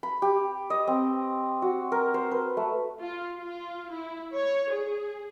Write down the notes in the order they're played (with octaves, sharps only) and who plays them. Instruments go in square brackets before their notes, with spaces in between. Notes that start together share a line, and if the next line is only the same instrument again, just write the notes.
[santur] B5
G4
D#5
C4
F#4
A#4
C5
B4
A3
[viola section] F4
F4
E4
C#5
G#4